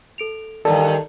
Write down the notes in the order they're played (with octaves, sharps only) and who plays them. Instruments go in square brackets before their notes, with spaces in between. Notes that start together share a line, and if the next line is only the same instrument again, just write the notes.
[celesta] A4 D7 F7
[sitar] E2 G2 [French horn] D#3 [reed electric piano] A4 [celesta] D5 A#5